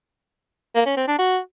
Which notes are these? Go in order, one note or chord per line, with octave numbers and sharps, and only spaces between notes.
A#3
C#4
C4
D4
F#4